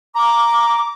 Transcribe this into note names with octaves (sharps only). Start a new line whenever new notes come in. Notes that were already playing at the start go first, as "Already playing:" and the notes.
A#5 D6